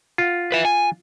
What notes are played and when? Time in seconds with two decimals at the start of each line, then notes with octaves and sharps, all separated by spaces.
0.18 F4 F#5
0.52 B4 E5
0.65 G#5